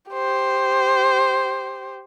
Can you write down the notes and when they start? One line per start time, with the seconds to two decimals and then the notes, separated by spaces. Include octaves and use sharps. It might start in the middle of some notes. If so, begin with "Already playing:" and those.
0.11 G4 C5